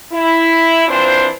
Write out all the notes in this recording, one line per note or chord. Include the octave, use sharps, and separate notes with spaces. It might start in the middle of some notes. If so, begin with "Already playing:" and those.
E4
E3 C4 D4 F4 C5